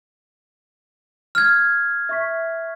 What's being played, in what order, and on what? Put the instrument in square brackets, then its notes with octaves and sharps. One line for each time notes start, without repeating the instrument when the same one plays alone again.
[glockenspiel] F6 G#6
[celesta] E5 C#6 B6